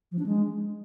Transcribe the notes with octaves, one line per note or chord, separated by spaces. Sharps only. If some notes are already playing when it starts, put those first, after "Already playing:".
F3
D4
G#3